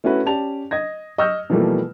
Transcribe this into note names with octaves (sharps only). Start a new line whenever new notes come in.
A3 C#4 E4 F#4 B4
C#4 G4 D5 A5 F7
D#5 G#6 A#6
D#5 C#6 E6 F6 G6
B2 E3 F3 G3 A3 A#3